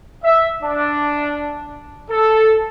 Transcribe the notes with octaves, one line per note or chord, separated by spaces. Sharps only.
E5
D4
A4